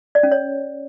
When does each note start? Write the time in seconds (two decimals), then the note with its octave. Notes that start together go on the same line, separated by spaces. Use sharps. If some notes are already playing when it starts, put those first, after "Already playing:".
0.15 D5
0.23 C#4
0.32 C#5